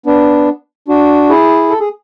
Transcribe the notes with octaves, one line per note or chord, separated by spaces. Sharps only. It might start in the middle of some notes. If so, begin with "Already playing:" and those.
B3 D4
D4 F#4
E4 G#4
A4
G#4